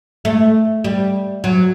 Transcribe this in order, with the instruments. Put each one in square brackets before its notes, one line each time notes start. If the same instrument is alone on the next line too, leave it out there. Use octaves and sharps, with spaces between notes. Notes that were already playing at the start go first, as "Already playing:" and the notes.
[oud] A3
G3
F#3